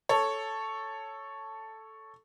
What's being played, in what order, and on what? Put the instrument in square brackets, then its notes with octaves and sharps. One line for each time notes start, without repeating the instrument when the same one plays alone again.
[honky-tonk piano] A4 C#5